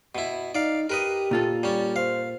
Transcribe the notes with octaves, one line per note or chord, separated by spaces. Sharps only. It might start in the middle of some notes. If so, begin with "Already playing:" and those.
B2 E4
D#4 D5 F5
G4 A#4 B4 D#5
A#2 F4 A4
G3 C#4
C5 F5